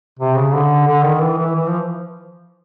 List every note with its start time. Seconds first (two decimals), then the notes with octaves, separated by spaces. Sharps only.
0.19 C3
0.36 C#3
0.54 D3
0.87 D3
1.04 D#3
1.22 E3
1.39 E3
1.56 E3
1.67 F3